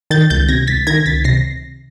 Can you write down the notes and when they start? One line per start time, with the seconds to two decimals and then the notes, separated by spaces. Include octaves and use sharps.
0.11 D#3 G6 A6
0.30 C#2 G6 A6
0.49 C3 G#6 A#6
0.67 C#2 A6 B6
0.87 D#3 G#6 A#6
1.06 C#2 A6 B6
1.24 C3 A#6 C7